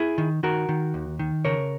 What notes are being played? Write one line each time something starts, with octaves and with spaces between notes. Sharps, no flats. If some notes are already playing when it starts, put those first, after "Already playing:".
Already playing: E4 G#4
D#3
D#3 F#4 A#4
D#3
D#2
D#3
C#3 A#4 C#5